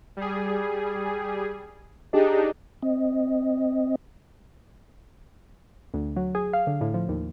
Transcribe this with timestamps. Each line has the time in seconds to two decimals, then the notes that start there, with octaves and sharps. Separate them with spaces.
0.17 G3 G#4
2.13 D4 D#4 G4 G#4 D#5
2.83 C4 D#5
5.94 D2
6.16 F#3
6.35 G#4
6.53 F5
6.67 D3
6.81 A2
6.94 F3
7.09 D#2